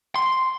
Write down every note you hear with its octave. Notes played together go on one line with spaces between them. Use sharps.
C6